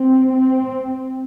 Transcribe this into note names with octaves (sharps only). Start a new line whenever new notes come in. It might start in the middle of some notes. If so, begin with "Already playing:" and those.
Already playing: C4
C4